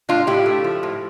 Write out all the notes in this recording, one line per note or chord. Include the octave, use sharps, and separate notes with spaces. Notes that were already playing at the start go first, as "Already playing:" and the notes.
A2 D4 F4
A2 E4 G4
A3
F3
A2